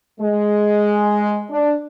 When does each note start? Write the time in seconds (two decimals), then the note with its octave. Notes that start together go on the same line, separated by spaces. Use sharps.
0.21 G#3
1.51 D4